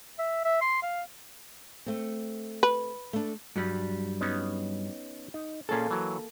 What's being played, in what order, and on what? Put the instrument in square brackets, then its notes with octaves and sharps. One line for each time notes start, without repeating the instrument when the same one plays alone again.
[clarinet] E5
E5
C6
F5
[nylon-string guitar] A3 C4
[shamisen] B4
[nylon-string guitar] A3 D4
[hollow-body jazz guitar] G2 F#3 G3
[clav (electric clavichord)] B3 C#4 D#4
D#4
[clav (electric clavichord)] A#2 C#4 G#4 [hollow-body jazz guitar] A#3 A4
[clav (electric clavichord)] E3 F#3